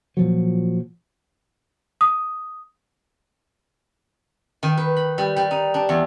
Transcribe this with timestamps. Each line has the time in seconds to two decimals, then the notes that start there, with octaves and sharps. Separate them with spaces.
0.17 A#2 F3 F#3
2.01 D#6
4.63 D#3
4.77 B4
4.96 B5
5.18 G3
5.36 G3
5.51 D#4
5.74 D4
5.89 E2